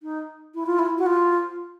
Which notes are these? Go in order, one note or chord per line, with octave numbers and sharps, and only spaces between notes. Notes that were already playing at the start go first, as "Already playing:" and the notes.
D#4
E4
F4
E4
F#4
F4